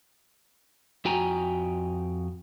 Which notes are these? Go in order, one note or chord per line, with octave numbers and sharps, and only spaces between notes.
F2 F#4 G5 G#5 A#5